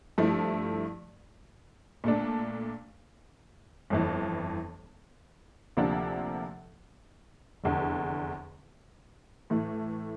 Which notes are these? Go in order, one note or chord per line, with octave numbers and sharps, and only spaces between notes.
G2 F3 A3 E4
A#2 A3 D4
G1 F2 E3
D2 C3 F3 A#3 D4
F1 E2 D3
A2 E3 A3